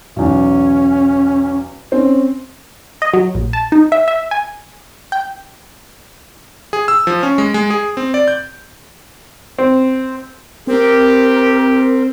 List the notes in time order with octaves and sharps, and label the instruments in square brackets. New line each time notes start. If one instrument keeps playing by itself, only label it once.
[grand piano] B1 E2 [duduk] C#4
[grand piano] C4 C#4
[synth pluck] D#5
F#3
A#1
A5
D#4
E5
E5
G#5
G5
[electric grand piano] G#4
E6
F3
C#4
G#3
G#3
G#4
C4
D5
G6
[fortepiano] C4
[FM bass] C4 [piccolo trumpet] G4 [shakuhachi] A#4